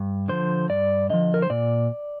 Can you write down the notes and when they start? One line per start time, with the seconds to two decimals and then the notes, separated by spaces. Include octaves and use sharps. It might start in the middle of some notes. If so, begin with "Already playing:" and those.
Already playing: G2
0.28 D3 F3 C5
0.69 G2 D5
1.10 D3 F3 D#5
1.34 A#4
1.42 C5
1.50 A#2 D5